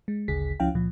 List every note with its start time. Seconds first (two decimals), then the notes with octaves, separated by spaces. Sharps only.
0.08 G#3
0.28 G#1 D2 C#3 G#4 B6
0.60 C#2 F3 C#4 E4 F5 G5
0.74 C#2 A#2 F3